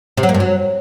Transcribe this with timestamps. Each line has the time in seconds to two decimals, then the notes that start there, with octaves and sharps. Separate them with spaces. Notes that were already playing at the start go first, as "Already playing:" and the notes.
0.17 C3
0.23 F#3
0.29 A#3
0.34 G2
0.40 F#3